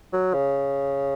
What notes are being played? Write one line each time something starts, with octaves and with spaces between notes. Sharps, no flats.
F#3
C#3